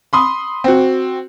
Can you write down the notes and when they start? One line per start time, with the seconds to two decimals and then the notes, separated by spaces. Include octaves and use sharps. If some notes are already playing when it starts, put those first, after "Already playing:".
0.13 B5 C6 D#6
0.64 C4 F#4